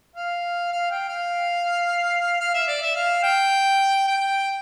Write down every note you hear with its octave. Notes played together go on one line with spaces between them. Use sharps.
F5
F5
G5
F5
F5
E5
D5
E5
F5
G5
G5